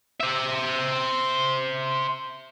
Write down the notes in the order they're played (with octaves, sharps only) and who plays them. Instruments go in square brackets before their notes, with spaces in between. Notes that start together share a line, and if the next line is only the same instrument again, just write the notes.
[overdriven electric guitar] C5 E5